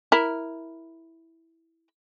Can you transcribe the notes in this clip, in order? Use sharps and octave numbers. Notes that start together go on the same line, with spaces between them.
E4 A#4